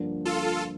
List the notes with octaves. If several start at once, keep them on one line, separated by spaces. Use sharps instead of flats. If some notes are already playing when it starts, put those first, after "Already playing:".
Already playing: G2 D3 F3 A#3 D4
F4 A4